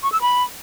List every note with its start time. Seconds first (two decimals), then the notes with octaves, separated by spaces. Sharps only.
0.03 C#6
0.12 E6
0.22 B5